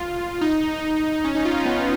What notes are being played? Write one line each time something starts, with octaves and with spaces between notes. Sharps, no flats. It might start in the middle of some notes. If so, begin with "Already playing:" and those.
Already playing: F4
D#4
C#4
D#4
F4
D#4
B3